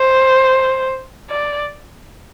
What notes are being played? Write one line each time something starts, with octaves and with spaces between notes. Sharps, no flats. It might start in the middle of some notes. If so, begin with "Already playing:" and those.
Already playing: C5
D5